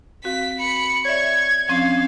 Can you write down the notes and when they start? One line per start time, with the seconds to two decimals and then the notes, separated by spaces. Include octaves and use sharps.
0.24 C4 F#4 F5 B6
0.59 B5 C#7
1.05 C#5 D5 E5 C#6 G#6
1.69 F3 C4 C#4 F5